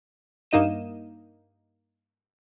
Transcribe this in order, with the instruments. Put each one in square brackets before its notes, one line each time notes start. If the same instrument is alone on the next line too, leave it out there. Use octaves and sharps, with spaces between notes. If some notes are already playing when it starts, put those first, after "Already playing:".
[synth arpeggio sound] G2 A#3 D#4 D#5 D#7 E7